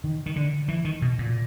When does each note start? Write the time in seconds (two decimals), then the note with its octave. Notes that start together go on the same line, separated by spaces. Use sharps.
0.04 D#3
0.26 D#3
0.36 D3
0.68 E3
0.85 D#3
1.02 B2
1.19 A#2